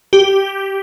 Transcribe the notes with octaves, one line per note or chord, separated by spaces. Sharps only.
G4